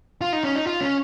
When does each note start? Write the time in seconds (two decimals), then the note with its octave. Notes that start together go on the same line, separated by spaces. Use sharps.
0.21 F4
0.33 D#4
0.44 C#4
0.55 D#4
0.67 F4
0.81 C#4